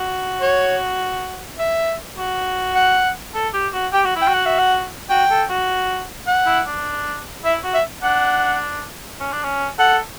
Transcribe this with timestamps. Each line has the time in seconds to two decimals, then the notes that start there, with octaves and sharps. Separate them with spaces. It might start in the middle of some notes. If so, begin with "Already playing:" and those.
Already playing: F#4
0.42 C#5
1.59 E5
2.18 F#4
2.75 F#5
3.34 A4
3.54 G4
3.73 F#4
3.93 G4 G5
4.04 F#4
4.16 E4
4.22 G5
4.28 F#4
4.34 F#5
4.46 E5
4.59 F#5
5.10 F#4 G5
5.30 A4
5.50 F#4
6.27 F#5
6.46 E4
6.66 D4
7.44 E4 E5
7.64 F#4
7.74 E5
8.03 D4 F#5
9.20 C#4
9.32 D4
9.43 C#4
9.79 A4 F#5